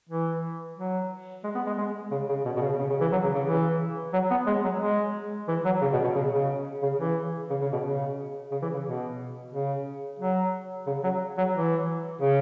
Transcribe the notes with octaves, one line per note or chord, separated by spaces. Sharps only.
E3
F#3
G#3
B3
G#3
G#3
C#3
C#3
B2
B2
C#3
C#3
C#3
E3
F#3
C#3
C#3
E3
F#3
B3
G#3
F#3
G#3
E3
F#3
C#3
B2
B2
C#3
C#3
C#3
E3
C#3
C#3
B2
C#3
C#3
E3
C#3
B2
C#3
F#3
C#3
F#3
F#3
E3
C#3